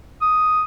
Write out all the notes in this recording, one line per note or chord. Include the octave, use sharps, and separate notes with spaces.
D#6